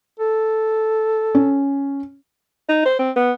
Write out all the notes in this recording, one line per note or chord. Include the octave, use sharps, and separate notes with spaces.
A4
C#4
D#4
C5
C4
B3